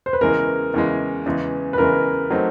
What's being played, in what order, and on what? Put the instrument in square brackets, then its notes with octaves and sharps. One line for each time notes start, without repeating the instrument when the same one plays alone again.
[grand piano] C5
B4
[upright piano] E2 C#3 E3 G#3 [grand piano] A#4
[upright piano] E2 C#3 E3 G#3
E2 C#3 E3 G#3
[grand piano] B4
[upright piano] E2 C#3 E3 G#3 [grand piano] A#4
[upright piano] F#3 A3 C4 D#4